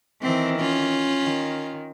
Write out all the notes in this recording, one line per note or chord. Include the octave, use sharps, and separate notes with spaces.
D#3 E3 C4
C#4 F4
D#3